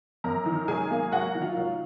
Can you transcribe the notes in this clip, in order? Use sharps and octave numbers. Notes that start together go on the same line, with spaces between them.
F#2 A#4 A#5
D#3
F#3 G#4 G#5
A#3
F#3 F#4 F#5
D#3
F4 F5
F#3